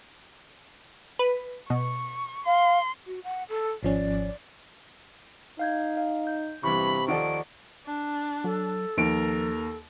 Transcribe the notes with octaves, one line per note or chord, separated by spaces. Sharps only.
B4
B2 C#6
F5 C6
F#4
F#5
A4
G#1 F3 C#4 D5
D#4 F5 G6 G#6
F5
G6
E2 G2 C3 B5 C#6
D#2 F3 A4 D5 F#5 C#6 D7
D4
F#3 A4
D#2 F3 A#4 D7